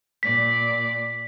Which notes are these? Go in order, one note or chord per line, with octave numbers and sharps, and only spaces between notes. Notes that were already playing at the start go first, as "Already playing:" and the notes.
A#2 D5 B6